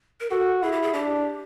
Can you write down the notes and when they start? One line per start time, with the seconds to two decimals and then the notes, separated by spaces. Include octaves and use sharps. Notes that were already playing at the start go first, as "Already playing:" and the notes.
0.20 A#4
0.30 F#4 A4
0.62 E4 G#4
0.72 G4
0.82 G#4
0.94 D4 G4